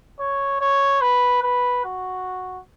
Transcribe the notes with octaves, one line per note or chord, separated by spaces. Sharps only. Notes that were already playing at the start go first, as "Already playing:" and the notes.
C#5
C#5
B4
B4
F#4